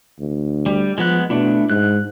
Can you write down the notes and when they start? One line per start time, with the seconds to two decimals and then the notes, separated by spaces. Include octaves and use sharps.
0.19 D2
0.66 G3
0.98 F3 G#3 B3 F#6
1.30 B2 A3 D4 E4
1.70 G#2 F#6